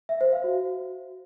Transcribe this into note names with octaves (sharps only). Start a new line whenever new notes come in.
E5
C5
F5
F#4